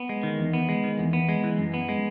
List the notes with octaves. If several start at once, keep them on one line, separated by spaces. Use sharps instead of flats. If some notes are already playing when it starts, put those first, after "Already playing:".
Already playing: B3
G#3
D#3
E2
B3
G#3
D#3
E2
B3
G#3
E3
F#2
B3
G#3